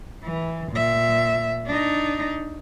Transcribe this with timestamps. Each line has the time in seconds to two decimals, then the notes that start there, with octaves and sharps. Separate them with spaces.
0.24 E3
0.72 A#2 E5
1.67 D4 D#4